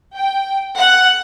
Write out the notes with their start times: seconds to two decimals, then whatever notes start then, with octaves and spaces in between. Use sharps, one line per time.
0.15 G5
0.79 F#5